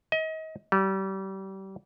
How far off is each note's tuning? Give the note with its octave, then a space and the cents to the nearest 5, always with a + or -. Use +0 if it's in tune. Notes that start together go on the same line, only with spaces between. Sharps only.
D#5 +35
G3 -30